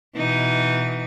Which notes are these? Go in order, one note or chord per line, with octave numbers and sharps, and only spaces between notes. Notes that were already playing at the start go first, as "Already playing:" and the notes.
B2 E3 D#4